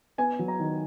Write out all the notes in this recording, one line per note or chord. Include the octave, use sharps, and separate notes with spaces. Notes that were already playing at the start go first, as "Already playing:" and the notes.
B3 G#5
F#3
A#5
D#3